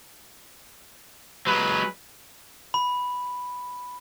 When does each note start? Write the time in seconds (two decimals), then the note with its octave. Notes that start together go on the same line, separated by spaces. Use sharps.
1.47 F#3 G#3 B4
2.74 B5